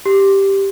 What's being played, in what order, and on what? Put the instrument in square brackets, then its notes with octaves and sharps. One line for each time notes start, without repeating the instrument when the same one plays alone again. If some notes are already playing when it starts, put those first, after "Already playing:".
[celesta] G4